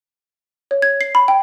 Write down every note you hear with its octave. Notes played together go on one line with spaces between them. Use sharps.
C#5
G#6
C7
B5
G5